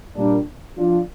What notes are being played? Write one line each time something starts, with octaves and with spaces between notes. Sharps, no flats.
A#2 G3 A#3 D4
F3 D4 F4